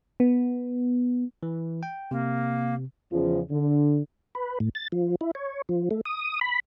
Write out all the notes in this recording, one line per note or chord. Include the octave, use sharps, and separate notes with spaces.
B3
E3
G5
C3 A#3
E2 C#3 F3
D3
B4
A2
A6
F3
E4
C#5
F3
A3
D#6
B5